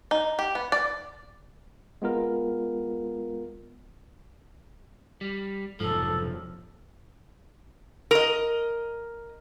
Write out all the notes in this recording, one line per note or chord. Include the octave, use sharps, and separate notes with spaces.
D#4
G4
B3
D5
G#3 B3 F4 A#4
G3
F1 B1 G#2 F3 A4
A#4 D#5